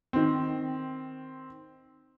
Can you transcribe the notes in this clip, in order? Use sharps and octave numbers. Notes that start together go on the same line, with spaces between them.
D#3 C4